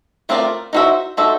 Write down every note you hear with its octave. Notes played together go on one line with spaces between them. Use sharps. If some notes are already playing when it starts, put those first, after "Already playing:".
A3 C4 F4 A#4 D5
D#4 F#4 A4 C5 E5
D#4 F#4 A4 C5 E5